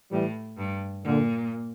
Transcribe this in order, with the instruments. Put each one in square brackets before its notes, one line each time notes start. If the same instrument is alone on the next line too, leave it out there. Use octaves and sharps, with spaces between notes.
[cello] A2 [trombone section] E3 G3
[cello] G2
[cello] A#2 [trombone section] D3